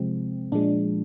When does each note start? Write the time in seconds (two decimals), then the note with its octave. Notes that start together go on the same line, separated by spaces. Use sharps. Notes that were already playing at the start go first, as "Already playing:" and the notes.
Already playing: C3 F3 G#3 C4
0.52 A#2 F3 G#3 D4